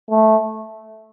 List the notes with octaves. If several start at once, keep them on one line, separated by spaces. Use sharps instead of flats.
A3